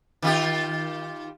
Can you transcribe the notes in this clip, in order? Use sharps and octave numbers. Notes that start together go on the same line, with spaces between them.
D#3 F4 G4